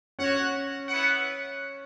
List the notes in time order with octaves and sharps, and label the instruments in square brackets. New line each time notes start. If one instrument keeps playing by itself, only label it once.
[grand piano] C#4 [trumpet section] F#4 C#5 F#5
[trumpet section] B3 E4 B4 F#5